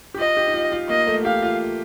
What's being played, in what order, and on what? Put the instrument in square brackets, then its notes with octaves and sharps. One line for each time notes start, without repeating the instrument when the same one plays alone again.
[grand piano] G4
[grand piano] F4 [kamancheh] D#5
[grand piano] G4
D#4
F4
F4
[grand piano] A#3 [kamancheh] D#5
[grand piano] A3
[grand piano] G4 [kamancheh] F5
[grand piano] F4